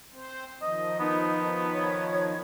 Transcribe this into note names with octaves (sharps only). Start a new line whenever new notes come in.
C4 C5
D#3 F3 D#5
B3 D#4
C#5